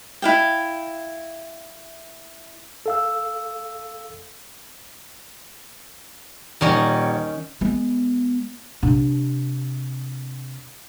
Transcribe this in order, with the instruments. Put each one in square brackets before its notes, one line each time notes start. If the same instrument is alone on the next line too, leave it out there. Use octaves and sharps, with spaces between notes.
[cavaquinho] E4 F5 G5
[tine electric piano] A4 F5 E6
[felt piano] D#1 D5 C#6 [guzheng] D#3 C#4 A#5
[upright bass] G#3 B3
C3 D4